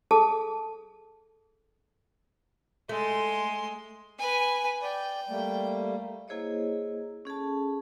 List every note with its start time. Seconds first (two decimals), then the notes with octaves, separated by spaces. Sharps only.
0.11 G#4 A4 A5 D6
2.89 G#3 A3 C6
4.18 B4 G#5
4.82 D5 G5
5.29 G3 A3 A#3
6.28 A#3 E4 G#4 C5 C#5 D#5
7.25 C#4 G#4 A4 A5